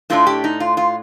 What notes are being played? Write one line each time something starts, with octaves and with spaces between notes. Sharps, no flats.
A2 A3 D4 F4
G4
D#4
F4
F4